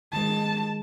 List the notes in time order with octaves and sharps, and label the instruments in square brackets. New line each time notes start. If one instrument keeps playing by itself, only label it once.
[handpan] D#3 G#3 [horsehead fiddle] A5